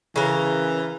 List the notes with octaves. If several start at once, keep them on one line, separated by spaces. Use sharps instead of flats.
C#3 E3 A#4